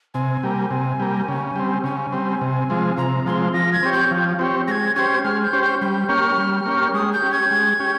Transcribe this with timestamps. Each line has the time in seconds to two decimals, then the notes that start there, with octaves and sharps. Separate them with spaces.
0.14 C3 G#5
0.43 G3 A#3
0.71 C3
0.99 G3 A#3
1.28 C#3
1.56 G3 C4
1.84 C#3 G#5
2.12 G3 C4
2.41 C3
2.70 F3 G#3 C4
2.97 C3 A#5
3.26 F3 G#3 C4 C6
3.54 F3 A#6
3.73 G#6
3.83 C4 G4 C#5
3.93 G6
4.11 F3
4.39 C4 G4 C#5
4.68 G#3 G#6 A#6
4.96 C#4 G4 C5 G#6
5.24 G#3 F6
5.43 G6
5.53 C#4 G4 C5
5.62 G6
5.81 G3 G6
6.09 A#3 C#4 G4 C#5 F6
6.38 G3
6.66 A#3 C#4 G4 C#5
6.94 G#3 D#6
7.13 G6
7.22 C#4 G4
7.32 G#6
7.51 G#3
7.80 C#4 G4